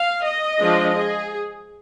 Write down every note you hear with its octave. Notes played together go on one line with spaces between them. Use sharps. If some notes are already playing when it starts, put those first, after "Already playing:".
Already playing: F5
D#5
F3 G#3 D4
G#4